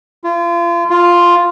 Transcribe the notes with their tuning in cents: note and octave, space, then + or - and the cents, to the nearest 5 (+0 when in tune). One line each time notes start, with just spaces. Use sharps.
F4 -35
F4 +0